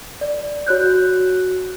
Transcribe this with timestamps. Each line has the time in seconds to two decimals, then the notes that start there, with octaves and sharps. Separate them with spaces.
0.21 D5
0.67 F#4 C#5 F#6 G6